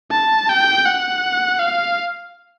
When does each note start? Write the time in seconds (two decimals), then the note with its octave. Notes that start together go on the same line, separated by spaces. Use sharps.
0.12 A5
0.49 G5
0.85 F#5
1.59 F5